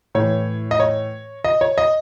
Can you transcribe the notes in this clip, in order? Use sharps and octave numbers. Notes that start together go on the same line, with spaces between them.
A2 E3 C#5
D#5
C#5
D#5
C#5
D#5